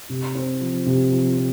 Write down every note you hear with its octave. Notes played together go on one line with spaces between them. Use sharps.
C3
C4
F3
C3
F3
C4